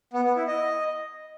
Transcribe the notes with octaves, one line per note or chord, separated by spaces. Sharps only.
B3
B3
E4
D#5